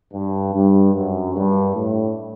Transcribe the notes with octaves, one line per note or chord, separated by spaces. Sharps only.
G2
G2
F#2
G2
A2